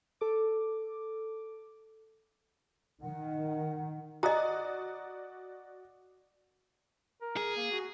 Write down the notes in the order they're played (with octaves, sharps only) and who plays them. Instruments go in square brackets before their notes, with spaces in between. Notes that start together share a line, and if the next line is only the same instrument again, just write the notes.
[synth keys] A4 D6
[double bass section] D#3 [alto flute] F#5
[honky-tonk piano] F#4 D5 D#6 [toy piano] D#5 A#5
[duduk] A#4
[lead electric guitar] G#4
[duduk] A#3
F#4